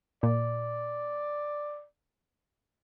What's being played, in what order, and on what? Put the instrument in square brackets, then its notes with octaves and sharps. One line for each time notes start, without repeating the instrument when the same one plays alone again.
[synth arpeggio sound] A#2 [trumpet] D5